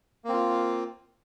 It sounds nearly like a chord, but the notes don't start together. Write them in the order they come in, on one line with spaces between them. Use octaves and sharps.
A#3 C4 F4